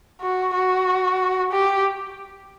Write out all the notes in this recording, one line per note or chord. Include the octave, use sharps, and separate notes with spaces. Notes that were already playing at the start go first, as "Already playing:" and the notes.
F#4
F#4
G4